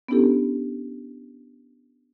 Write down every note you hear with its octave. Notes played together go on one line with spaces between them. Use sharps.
B3 C#4 D4 E4 G4 A4